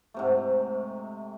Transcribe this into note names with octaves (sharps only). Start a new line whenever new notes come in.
G#2 C3 A3